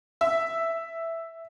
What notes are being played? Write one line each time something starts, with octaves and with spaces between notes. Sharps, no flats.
E5